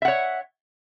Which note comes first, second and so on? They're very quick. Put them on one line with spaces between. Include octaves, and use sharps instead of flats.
E5 F#5 C#5